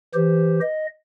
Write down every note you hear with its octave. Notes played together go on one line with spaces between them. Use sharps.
E3 G4 C5
D#5